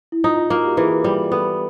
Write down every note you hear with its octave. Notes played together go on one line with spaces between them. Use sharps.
E4
D#4 F4
F4
A#3 F#4
G4
E3 G#4
G3
B3 A4